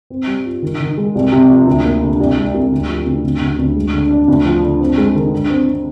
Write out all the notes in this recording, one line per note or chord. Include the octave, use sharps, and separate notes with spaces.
C4
G3
F4
D#3
D#3
G#3
C2
C3
F3
D2
A#3
D3
C2
G#3
C2
D2
F3
D2
D2
D2
D2
G#3
D3
D4
D2
F3
D3
C4
G#3
D#3
D3
C4
C4